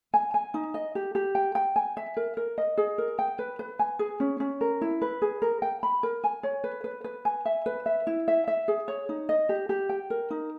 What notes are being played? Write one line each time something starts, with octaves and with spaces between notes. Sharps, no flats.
G#5
G#5
D#4
D#5
G4
G4
G5
G5
G#5
E5
A#4
A#4
D#5
G#4
A#4
G5
B4
B4
G#5
G#4
C#4
C#4
A#4
E4
B4
G#4
A#4
G5
B5
A#4
G#5
C#5
B4
B4
B4
G#5
E5
B4
E5
E4
E5
E5
G#4
C#5
D#4
D#5
G4
G4
G5
A#4
D#4